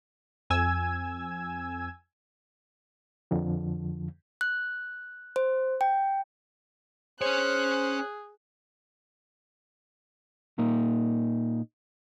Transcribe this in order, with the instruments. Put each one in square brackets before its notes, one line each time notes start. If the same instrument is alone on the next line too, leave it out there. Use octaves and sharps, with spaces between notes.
[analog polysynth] F2 G#5 E6 G#6
[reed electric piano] F2 D3 F3
[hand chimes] F#6
C5
G5
[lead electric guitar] C#4 C#5 [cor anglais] G#4 [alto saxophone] C5 [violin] F#6
[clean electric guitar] A#2 A#3 D#4